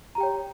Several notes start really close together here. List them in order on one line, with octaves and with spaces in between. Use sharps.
A#5 G4 G5 C#5